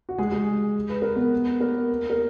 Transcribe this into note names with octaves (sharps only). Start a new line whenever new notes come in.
F#4
G#3 G#4
G#3 G#4
B4
A#4
B3 B4
A#3 A#4
A#4